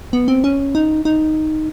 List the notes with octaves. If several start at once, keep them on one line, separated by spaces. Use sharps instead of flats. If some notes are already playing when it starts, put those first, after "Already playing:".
B3
C4
C#4
D#4
D#4